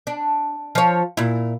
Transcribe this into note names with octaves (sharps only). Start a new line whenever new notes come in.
D4
F3 C#5
A#2 E4